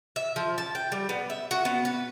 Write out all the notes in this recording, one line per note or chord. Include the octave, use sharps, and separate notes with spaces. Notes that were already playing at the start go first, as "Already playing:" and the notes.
E5
F3
A5
G5
G3
B3
E5
F#4
B3
B4